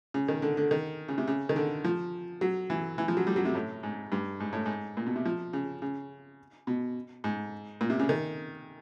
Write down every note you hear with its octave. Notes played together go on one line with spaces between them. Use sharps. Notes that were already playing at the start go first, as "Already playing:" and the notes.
C#3
D#3
D3
D3
D#3
C#3
C3
C#3
D#3
D3
F3
F#3
E3
E3
F3
F#3
G3
F#3
C3
A2
G#2
G2
G#2
A2
G#2
A#2
B2
C3
F3
C#3
C#3
B2
G#2
A#2
C3
C#3
D#3